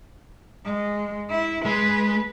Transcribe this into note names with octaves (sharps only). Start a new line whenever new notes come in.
G#3
E4
G#3 B4